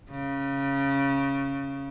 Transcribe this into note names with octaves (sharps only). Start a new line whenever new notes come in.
C#3